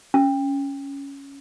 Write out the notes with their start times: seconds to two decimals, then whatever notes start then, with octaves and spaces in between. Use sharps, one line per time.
0.14 C#4